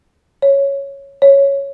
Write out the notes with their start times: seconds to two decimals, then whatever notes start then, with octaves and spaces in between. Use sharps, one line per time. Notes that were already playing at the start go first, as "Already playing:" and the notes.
0.42 C#5
1.22 C#5